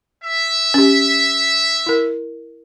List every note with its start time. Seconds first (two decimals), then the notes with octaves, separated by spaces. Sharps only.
0.24 E5
0.74 C#4 G4
1.86 E4 A#4